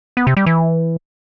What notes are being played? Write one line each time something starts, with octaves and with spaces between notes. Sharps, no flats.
B3
C3
G3
E3